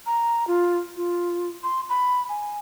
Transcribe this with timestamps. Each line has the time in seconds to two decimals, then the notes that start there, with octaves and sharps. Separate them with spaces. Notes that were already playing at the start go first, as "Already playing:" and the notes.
0.06 A#5
0.47 F4
0.96 F4
1.63 C6
1.90 B5
2.29 G#5